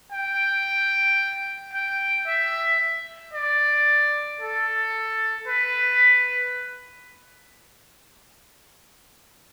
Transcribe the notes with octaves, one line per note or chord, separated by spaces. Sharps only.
G5
G5
E5
D5
A4
B4